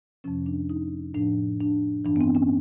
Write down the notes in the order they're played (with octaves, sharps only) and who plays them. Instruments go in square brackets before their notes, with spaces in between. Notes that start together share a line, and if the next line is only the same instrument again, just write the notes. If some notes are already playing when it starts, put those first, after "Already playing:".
[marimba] F2 C3 F3 C#4
D4
D#4
A2 F3 D4
D4
G2 E3 D4
B3
C4
C#4